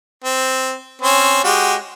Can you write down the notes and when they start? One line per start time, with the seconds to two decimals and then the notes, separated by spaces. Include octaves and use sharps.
0.24 C4
1.02 C4 C#4 C5
1.44 G#3 F#4 G4